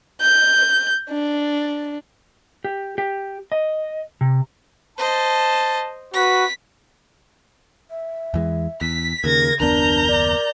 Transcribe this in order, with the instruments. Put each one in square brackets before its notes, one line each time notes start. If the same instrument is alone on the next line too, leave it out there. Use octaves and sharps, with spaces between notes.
[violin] G6
D4
[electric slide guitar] G4
G4
D#5
C3
[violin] C5 D#5 [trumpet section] A5
[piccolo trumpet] F#4 [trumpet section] B4 [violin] B6
[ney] E5
[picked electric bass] E2 E3 G#3
[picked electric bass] E2 [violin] B6
[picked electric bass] D#2 [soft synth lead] C#3 [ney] A#4 [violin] G#6 A#6
[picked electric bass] F#1 D#2 B3 [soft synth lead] D4 [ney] A#4 [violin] A#5 G6
[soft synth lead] D5